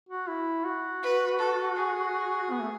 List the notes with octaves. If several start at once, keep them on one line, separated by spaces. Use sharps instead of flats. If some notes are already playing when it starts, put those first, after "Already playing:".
F#4
E4
F#4
B4
A4
G#4
B3
A3